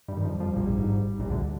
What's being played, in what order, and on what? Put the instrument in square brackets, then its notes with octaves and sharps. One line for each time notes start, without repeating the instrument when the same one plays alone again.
[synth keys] G2 G3
D#3
[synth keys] F2 F3 [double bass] G3
[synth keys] F2 F3
A#1 A#2
G2
G#1 G#2
A#1 A#2
D2 D3